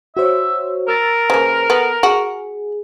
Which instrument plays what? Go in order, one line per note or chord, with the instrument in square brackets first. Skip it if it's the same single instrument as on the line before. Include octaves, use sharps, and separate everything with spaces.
[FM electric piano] F#4 C5 C#5 [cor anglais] E5
[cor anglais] A#4 [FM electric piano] E6 A6
[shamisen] C#3 A#3 [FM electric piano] B4 C5
[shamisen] B3 [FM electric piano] A4
[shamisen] F#4 [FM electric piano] G#4